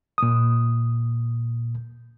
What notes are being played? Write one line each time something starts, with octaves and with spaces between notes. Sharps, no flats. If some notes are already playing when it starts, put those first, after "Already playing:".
A#2 D#6